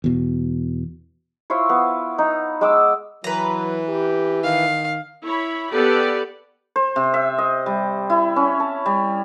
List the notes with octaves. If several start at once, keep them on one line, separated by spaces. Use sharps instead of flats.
E2 B2
E4 F4 C5 C#5
B3
D#4
G#3 D6 E6
E3 F#3 B4 A#5
G4
D#3 F5
E4 C#5 B5
B3 G4 A4 B4 D5 F#5
C5
C3
E5
D#5
G3
E4
C#4
A5
G3